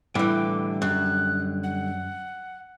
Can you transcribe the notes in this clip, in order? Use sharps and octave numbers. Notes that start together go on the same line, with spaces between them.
A2 D3 E3 G3 G5 D6
F#2 F#6
F#5